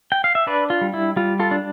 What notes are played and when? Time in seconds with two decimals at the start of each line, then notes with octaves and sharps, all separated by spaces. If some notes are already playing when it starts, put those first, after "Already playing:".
0.12 G5
0.24 F5
0.35 E5
0.47 D4 B4 D5
0.70 F4
0.81 G3
0.94 E4
1.16 G3 F4
1.40 F4 A4
1.51 D4